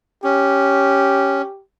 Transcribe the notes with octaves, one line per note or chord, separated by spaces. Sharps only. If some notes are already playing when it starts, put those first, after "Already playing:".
C#4 G4